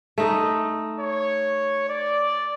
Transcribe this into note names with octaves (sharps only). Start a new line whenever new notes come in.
A3 D#4 D#5
C#5
D5